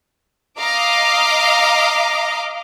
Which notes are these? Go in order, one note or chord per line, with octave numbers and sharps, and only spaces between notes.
D#5 F5 A#5 D6